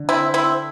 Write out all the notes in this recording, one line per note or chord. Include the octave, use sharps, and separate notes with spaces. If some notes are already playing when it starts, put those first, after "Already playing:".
Already playing: D3
C4 E4
C4 E4